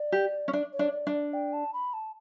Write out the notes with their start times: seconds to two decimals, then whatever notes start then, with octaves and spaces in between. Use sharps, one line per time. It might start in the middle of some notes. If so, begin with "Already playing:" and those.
Already playing: D5
0.12 G4
0.48 C#4
0.53 D4
0.73 C#5
0.79 D4
0.93 D5
1.07 D4
1.13 D5
1.33 G5
1.53 A5
1.73 B5
1.93 A5